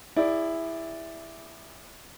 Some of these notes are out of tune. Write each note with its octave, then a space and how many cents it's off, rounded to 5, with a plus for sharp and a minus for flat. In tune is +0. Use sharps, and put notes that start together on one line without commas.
E4 +0 G#4 -35 D5 -5